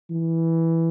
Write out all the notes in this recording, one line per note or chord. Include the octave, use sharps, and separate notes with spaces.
E3